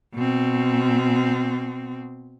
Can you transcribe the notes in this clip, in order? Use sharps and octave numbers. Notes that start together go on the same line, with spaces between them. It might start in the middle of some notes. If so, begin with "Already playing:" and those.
B2 C4